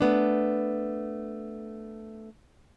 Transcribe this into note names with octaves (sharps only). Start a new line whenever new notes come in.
A3 B3 D4